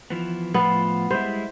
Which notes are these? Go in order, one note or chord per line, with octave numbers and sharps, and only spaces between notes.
E3 F3 B3
A2 F3 B3 F4
G3 G#3 E4 C5